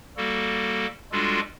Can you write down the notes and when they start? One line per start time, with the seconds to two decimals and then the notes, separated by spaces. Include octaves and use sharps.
0.17 G3 A#3 F#4 A4
1.12 G3 G#3 D4 F4 F#4 A4